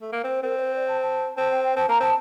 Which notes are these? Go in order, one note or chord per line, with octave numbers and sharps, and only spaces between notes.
A3
A#3
C4 C5
C4 A#4
D5
C5
D5
A5
A5
C4 A5
G5
G5
C4 A5
A#3 A#5
C4 A5